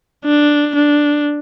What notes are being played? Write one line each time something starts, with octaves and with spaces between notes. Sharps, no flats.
D4
D4